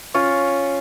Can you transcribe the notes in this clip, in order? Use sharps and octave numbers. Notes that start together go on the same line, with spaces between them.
C#4 F4 C#5